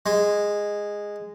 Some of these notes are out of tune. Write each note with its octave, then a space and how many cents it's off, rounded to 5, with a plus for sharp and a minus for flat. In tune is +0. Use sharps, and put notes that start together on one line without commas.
G#3 -10